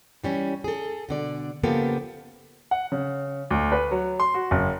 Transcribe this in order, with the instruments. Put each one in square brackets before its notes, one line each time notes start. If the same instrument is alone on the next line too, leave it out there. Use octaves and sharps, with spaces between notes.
[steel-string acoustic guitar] E3 G3 C#4
G#4 A4
B2 D3 D5
C#3 F3 A#3 B3 G4 A4
[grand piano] F#5
C#3
D2
B4
F#3
C6
F#4
F#1